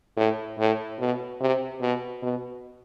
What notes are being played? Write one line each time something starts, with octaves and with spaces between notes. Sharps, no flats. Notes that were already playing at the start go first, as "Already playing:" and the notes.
A2
A2
B2
C3
B2
B2